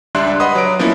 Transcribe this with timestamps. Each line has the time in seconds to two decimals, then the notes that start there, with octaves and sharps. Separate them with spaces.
0.15 C#2 G3 D4 E5 C6 F#6
0.40 B4 D#5 F#5 B5 C6 D#6
0.55 F#3 D7
0.79 F3 A#3 B3 C#4 E4